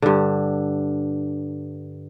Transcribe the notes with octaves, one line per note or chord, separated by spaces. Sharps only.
G2 D3